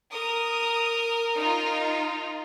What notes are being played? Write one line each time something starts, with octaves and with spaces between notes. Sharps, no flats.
A#4 D#6
D#4 F4